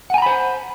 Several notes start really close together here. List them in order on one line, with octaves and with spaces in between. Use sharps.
F#5 G#5 A#5 B5 C5